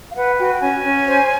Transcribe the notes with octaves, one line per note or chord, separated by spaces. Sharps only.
F5
B4 F#5
F#4 G5
G5
C#4 G#5
C#4
C5